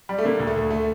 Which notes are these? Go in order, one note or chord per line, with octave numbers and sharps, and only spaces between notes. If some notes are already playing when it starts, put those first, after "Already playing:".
G3
A3
D3 A#3
D2
A3
D2
A3